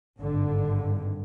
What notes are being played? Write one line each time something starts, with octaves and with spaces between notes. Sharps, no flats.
G#1 G2 D3